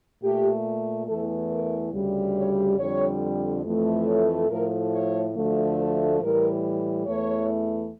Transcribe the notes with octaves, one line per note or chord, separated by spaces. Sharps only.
A#2 A3 G4
E2 E3 A3 A4
A#4
D2 C#3 G3
C#5
F2 D3 G3 C#5
F2 E3 A3
C#5
A2 F3 A3 A#4
C#5
D2 D3 F3 A3
A4
A2 E3 G3 A#4
E2 E3 A3 C#5